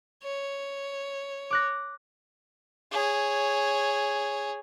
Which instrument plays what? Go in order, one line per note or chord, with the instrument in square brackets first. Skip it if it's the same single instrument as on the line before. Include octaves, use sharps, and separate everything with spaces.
[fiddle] C#5
[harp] D6 F#6 A#6
[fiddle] G#4 C#5